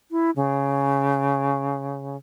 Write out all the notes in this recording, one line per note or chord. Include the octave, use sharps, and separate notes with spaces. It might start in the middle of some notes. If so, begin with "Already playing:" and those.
E4
C#3